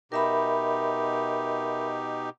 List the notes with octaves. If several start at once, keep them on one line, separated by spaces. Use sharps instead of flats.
B2 D#4 G4 A#4 E5 B5